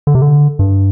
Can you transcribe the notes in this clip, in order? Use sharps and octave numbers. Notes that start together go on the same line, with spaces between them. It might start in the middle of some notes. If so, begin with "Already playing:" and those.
D3
C3
D3
G2